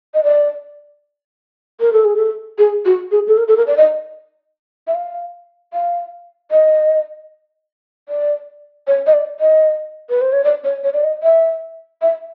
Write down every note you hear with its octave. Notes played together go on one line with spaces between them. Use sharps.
D#5
D5
A#4
A4
G#4
A4
G#4
F#4
G#4
A4
A#4
A4
A#4
D5
D#5
E5
F5
F5
D#5
D5
C#5
D#5
D5
D#5
B4
C5
C#5
D5
C#5
C#5
D5
D#5
E5
E5